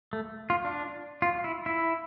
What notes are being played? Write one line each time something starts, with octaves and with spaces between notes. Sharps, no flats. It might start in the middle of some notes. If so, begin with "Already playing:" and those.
A3
F4
D4
F4
E4
E4